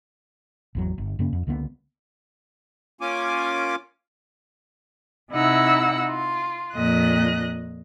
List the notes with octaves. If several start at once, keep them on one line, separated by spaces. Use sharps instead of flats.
G#1 E2 F#3
G1
F#2 C#3 A#3 C#4
F2
C#2 D3 A#3 B3
A#3 C#4 F4 G#5 D6
C3 D#4 E4 F#5 E6
F4
F2 A#2 D#5 F#6